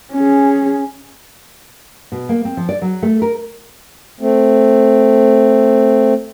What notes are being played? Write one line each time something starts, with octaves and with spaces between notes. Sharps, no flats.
C#4 G#4
B2
A#3
C4
F3
D5
F#3
A3
A#4
A3 C4